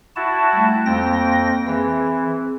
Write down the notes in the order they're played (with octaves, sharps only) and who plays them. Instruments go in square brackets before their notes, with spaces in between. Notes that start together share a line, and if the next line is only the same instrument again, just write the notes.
[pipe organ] E4 F#4 A5
[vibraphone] G3 A3
[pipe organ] F2 G5 A#6 [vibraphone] A#3 C4
[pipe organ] E3 [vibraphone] C4 G#4